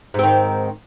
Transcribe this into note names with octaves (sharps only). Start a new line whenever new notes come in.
G#2 D#3 C4